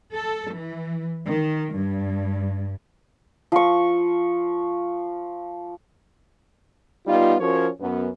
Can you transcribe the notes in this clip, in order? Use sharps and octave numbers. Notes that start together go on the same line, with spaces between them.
A4
E3
D#3
G2
F3 C#6
G3 B3 D#4 F4
F3 C#4 F#4 A#4 C#5
F#2 B3 C#4